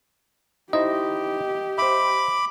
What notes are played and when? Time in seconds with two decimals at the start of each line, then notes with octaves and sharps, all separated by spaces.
0.73 D#4 E4 G4 C5 D#5
1.78 C5 E5 B5 D6